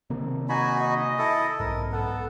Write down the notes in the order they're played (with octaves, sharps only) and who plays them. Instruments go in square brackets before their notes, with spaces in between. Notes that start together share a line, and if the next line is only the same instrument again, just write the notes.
[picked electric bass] C3 D#3 A#3
[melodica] D#4 F#4 B5 [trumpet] G#5
[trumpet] D#5
[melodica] E4 A4
[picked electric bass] B1 G#2 [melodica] A#4
[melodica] B3 [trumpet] A4